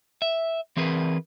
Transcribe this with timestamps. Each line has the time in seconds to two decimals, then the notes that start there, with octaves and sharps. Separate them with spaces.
0.22 E5
0.77 E3 C4 G#4 A#4 B4